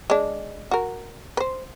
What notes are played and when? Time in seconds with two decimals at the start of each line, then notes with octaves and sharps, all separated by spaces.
0.10 G#3 D4
0.71 F#4 A#4
1.37 B4 C5